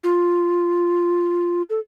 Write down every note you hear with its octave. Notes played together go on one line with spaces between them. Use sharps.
F4
A4